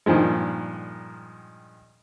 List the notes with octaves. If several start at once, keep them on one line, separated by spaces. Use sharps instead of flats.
G2 A#2 D#3 F3 G#3